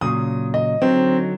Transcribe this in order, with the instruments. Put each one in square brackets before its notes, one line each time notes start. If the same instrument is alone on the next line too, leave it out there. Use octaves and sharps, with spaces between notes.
[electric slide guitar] A#2 C#3 F#3 [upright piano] D#6
[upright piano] D#5
[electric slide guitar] D3 F#3 D#4 [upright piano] C4